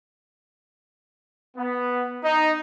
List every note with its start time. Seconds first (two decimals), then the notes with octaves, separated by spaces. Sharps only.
1.57 B3
2.24 D#4